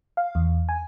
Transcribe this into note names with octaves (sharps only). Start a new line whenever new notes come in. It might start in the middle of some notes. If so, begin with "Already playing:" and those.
F5
E2
G#5